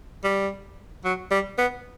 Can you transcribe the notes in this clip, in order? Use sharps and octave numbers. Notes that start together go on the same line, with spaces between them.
G3
F#3
G3
B3